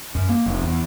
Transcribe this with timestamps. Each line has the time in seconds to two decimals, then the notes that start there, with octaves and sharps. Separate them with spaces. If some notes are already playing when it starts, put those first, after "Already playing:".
0.15 F#2
0.29 A#3
0.46 F1
0.62 E2